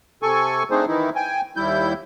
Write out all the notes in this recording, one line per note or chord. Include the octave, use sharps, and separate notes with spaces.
C3 A4 G#5 C#6
A3 C4 D4 D#4 G#4 C5
D#3 E3 D#4 E4
G5 G#5
D#2 G3 E4 G6